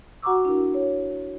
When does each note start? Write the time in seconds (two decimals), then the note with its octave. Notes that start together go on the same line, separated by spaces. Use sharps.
0.22 F#4 F#5 A#5 C#6 D6 E6
0.45 D4 E4 F#4 A#4
0.74 C#5